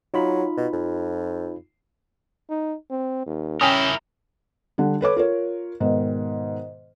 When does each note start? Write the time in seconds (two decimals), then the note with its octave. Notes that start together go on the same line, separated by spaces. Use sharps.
0.14 F#3 D#4 F4 B5
0.57 B2
0.73 F2
2.50 D#4
2.90 C4
3.26 D#2
3.61 C#4 E4 A#4 G5 G#5 D#6
4.78 D3 G3
5.01 A4 B4 C#5 D6
5.16 F4 A#4 C#5
5.80 G#2 B2 D#3